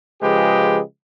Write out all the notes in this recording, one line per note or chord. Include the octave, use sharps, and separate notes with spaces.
C#3 F3 G#3 G4 G#4 B4